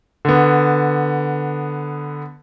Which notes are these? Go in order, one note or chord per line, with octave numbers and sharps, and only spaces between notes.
D3 B3